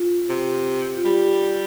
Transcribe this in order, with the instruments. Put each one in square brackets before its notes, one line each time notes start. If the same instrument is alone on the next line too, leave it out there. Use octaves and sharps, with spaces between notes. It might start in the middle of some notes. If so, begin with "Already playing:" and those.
Already playing: [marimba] F4
[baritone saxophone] C3
[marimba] F4
[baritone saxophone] G3 [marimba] G4